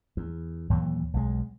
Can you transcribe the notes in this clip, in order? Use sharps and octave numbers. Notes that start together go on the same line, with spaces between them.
E2
D#2 A#2 E3 F#3
B1 G#3